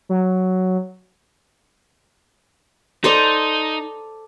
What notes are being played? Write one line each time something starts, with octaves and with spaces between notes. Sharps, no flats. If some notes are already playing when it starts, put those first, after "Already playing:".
F#3
D#4 A4 C5 D5